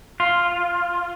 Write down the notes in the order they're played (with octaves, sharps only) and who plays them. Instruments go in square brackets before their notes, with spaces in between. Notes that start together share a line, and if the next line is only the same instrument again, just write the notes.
[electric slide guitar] F4